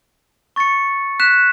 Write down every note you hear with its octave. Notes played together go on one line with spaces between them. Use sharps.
C#6 A6 C#7
F#6 B6 E7